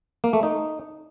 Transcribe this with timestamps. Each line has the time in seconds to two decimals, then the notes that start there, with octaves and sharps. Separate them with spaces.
0.24 A#3
0.33 A3
0.43 D#4